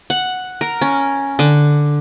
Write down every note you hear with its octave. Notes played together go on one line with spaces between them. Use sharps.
F#5
A#4
C#4
D3